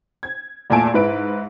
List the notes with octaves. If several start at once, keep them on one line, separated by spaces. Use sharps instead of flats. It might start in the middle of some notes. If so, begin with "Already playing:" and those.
G#6
E2 A#2 A3 G#5 A5 D7
G#2 E4 B4 D7